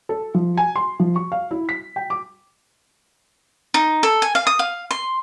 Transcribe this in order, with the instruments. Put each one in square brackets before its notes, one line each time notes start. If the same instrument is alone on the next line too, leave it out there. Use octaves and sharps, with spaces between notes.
[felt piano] A4
F3
G#5
C6
F3
C#6
F5
E4
B6
G5
D6
[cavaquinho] D#4
A4
G#5
F5
D#6
F5
C6